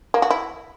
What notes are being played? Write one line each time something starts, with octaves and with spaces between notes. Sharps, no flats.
A#3
F#4
E4